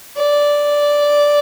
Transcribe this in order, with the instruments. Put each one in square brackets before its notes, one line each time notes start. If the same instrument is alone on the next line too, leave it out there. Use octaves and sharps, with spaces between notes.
[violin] D5